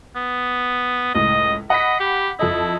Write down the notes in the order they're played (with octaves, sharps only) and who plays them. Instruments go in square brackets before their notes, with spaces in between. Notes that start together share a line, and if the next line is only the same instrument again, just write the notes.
[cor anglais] B3
[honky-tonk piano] C#2 A2 [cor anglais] D#5
[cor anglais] D#5 [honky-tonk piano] F#5 B5 B6
[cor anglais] G4
[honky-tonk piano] F2 A4 D#5 [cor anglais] E4